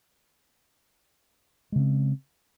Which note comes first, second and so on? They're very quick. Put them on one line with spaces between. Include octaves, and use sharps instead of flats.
G#3 C#3 C4